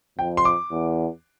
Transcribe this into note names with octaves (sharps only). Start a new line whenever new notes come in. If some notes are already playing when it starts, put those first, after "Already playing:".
F2 G5
C6
D6
E2